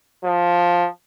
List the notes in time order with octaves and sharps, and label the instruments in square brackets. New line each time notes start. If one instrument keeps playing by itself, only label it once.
[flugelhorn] F3